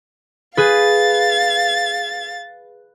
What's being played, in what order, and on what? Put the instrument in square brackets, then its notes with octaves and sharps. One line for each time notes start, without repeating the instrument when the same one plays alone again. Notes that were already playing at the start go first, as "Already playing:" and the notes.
[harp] G#4 B4 [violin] F5 A6